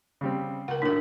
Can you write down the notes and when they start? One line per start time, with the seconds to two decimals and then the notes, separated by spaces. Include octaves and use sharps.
0.21 C#3 G3 C4
0.68 C#2 A#4 F#5
0.82 G#1 A2 D4 A#4